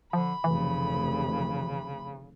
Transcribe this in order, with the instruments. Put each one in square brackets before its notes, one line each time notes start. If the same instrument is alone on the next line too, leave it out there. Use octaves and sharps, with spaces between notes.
[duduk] D3 [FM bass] F3 [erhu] B5
[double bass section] F1 D2 [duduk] C#3 [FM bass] E3